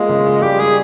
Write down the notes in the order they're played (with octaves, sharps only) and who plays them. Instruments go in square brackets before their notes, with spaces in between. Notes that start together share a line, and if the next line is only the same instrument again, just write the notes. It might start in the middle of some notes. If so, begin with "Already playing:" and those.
Already playing: [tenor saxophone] G#3 [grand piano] A#3 F4
[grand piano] C#3
F4
[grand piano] G3 [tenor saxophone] G4
[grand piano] G3 [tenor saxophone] G#4